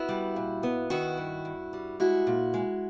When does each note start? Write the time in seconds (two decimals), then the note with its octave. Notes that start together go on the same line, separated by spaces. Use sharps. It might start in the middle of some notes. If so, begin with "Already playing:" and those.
Already playing: B3 E4 F#4
0.09 G3
0.36 A#2
0.63 B3
0.90 D#3 E4 F#4
1.18 G2
1.45 G2
1.73 G3
2.00 G#3 E4 F#4
2.27 A#2
2.54 G#3